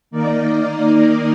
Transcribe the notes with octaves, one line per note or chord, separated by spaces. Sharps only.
D#3 A#3 D#4 A#4 D5